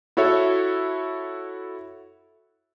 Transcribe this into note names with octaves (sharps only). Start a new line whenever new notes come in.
E4 F#4 A4 C#5 E5